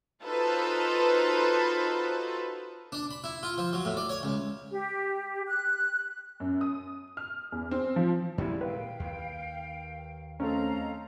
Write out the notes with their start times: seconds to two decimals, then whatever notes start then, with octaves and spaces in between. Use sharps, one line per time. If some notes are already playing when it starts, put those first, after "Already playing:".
0.24 D#4 F4 F#4 A4 B4 C5
2.92 D4
3.11 B5
3.24 E4
3.43 F4
3.58 F3
3.73 F#3
3.85 A2
3.97 D5
4.09 C#5
4.23 C#2
4.71 G4
5.47 F#6
6.40 F#2
6.61 D#6
7.17 F6
7.52 E2
7.71 C4
7.96 F3
8.38 A#2 D#3 G3 G#3 E4
8.61 B4 F5 G5
9.00 D#2
10.40 A3 C4 C#4 D#5 F5 A#5